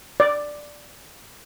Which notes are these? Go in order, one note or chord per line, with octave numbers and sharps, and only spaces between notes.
D5